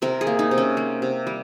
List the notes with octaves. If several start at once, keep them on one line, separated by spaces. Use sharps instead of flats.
C3 A#4
G#4
A#3
D#4
C3
C#4
A#3
C3
G3